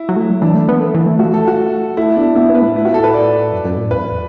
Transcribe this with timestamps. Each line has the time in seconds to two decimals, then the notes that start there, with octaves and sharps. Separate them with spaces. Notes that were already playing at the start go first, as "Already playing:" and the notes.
Already playing: E4
0.09 F#3
0.16 A3
0.30 F#3
0.42 E3 D4
0.55 A3
0.69 B3
0.80 A3
0.94 E3
1.06 A3
1.19 A3 F#4
1.34 A4
1.48 F#4
1.97 A3 E4
2.16 B3 D4
2.35 B3 E4
2.49 B3
2.55 B4
2.62 A2
2.76 E4
2.85 F#4
2.94 A4
3.04 B4
3.14 D5
3.52 F#2
3.65 F#2
3.77 A2
3.91 E2 B4